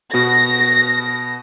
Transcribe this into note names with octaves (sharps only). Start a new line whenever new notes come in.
B2 B3 F#4 A#6